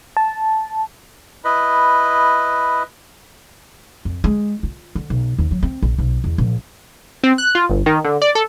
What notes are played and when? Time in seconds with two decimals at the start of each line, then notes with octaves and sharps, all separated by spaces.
0.17 A5
1.45 E4 B4 D#5 B5
4.05 F2
4.24 G#3
4.63 F4
4.95 D3
5.10 B1
5.39 D#2
5.51 F#3
5.63 C4
5.82 A#1
5.98 B1
6.24 E2
6.38 A#1
7.24 C4
7.38 F#6
7.55 F4
7.69 G1
7.86 D#3
8.05 D3
8.22 D5
8.35 A4